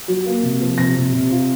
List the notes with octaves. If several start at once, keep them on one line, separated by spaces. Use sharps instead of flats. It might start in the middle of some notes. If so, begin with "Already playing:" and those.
F#3
A#3
C3
F3
C3 A#6
C3
C3
F4